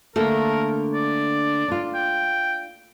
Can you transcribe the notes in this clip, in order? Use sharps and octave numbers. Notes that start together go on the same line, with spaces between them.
D3 A3 A#3 A#4
D5
D4 F4
G5